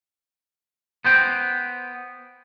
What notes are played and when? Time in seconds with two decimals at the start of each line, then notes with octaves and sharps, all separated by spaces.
1.05 B3 C5 G5